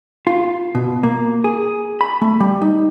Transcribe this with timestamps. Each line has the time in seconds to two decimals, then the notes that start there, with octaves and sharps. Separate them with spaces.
0.27 F4
0.75 B2
1.03 A#3
1.44 G#4
2.01 B5
2.22 A3
2.40 G3
2.62 D#4